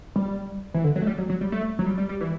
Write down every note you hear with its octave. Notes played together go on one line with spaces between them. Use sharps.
G3
E3
D3
F#3
A3
G3
F#3
F#3
G3
A3
F#3
G3
G3
G3
E3